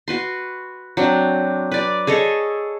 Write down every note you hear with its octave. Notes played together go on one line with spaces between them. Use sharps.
F#4 B4 C6
F#3 C4 D4
B4 D5
G#4 A4 C#5 D#5